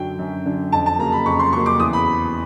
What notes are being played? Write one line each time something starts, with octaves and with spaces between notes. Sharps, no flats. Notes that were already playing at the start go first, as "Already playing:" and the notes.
Already playing: F#2 D3 F#3 G5
F#2
D3 F#3
F2 A5
A5
C#3 F#3 A#3 A#5
B5
F2 C#6
C6
C#3 F#3 A#3 C#6
D6
E2 D#6
B5